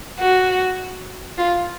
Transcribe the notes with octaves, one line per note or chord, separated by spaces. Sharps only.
F#4
F4